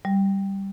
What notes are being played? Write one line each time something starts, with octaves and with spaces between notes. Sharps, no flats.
G3